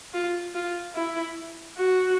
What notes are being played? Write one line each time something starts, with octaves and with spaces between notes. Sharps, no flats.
F4
F4
E4
F#4